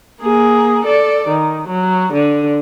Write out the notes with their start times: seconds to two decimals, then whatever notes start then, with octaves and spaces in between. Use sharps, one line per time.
0.22 A#3 G#4
0.85 A4 D5
1.28 D#3
1.68 F#3
2.13 D3